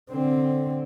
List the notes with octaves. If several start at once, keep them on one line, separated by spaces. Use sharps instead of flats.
D3 C4